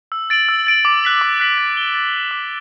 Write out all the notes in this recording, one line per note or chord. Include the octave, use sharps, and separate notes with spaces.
E6
A6 D7 F#7
E6
A6 D7 F#7
D6
F#6 B6 F#7
D6
F#6 B6 F#7
A6
E7 G7
A6
E7 G7
D6